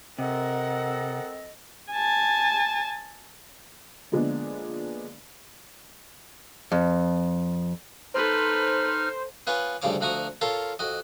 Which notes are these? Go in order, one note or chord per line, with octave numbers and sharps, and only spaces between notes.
C3 C4 A4 A#4 D#5 F#5
G#5 A5
D3 F3 G#3 A#3 B3 D4
F2
D#4 A4 B4 C5 F6
B3 F4 B4 C#5 G#5
D2 G2 C#3 F3 C#5 D6
D2 F3 F#4 A#5 C#6 D#6
F4 A4 A#4 C#5 C6
F2 F#4 D#5